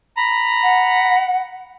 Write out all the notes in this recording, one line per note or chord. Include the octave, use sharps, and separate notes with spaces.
A#5 B5
F#5